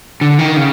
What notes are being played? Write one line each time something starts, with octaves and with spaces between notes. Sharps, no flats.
D3
D#3
C#3